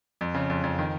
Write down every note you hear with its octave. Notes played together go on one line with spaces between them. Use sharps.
F2
C#3
F2
F2
D#3